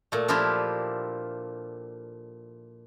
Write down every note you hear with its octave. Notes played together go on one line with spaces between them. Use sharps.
A#2 A3
F3 A#3 D4 E4 F4 G4